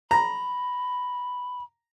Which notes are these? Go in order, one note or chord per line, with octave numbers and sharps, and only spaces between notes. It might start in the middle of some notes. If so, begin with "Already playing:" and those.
A#5 B5